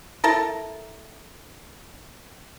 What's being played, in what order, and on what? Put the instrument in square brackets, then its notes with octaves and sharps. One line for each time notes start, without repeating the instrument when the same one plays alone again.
[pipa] E4 A4 A#4